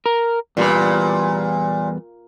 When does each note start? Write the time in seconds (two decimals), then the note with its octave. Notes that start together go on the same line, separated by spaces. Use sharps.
0.06 A#4
0.57 E2 A#2 G3 B4